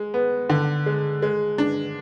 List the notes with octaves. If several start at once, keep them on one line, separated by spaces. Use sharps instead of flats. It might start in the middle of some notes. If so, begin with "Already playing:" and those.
Already playing: G#3
B3
D3
G#3
G#3
D4